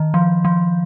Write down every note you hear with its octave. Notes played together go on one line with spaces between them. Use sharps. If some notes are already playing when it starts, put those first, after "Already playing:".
Already playing: D#3
F3
F3